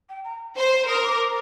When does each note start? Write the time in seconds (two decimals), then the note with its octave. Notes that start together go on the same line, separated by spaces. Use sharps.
0.09 G5
0.24 A#5
0.57 C5
0.88 A#4 D#6
1.03 D6